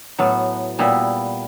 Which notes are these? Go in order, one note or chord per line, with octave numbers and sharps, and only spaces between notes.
A2 F#3 B3
A#2 G3 B3 E4